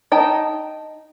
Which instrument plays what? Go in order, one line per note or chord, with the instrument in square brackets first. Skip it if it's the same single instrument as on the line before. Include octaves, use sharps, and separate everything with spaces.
[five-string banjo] D#4 D#5 G5 A5